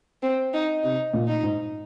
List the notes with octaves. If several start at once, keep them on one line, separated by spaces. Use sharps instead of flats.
C4
D#4
C3 D#4
A#2
D#4
G#2